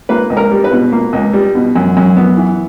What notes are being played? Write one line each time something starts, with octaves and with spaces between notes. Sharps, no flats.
A#3 B4
C#2
A#4
G3
B4
B2
A#3
C#2
G3
B2
F#2
F#2
B3
E3